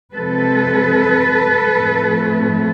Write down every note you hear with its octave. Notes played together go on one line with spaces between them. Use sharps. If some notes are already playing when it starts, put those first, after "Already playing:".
C3 F3 G#3 C4 A4 B4
A2 F3 A3 C4